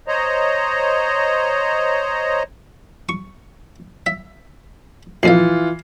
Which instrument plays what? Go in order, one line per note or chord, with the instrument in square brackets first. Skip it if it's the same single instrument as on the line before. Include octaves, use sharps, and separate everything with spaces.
[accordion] C5 C#5 D#5 A#5
[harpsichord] C#6
E5
[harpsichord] A#1 F2 F5 [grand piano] E3 F4 C7